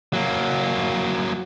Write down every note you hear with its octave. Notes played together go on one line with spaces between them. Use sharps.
F#3 A#3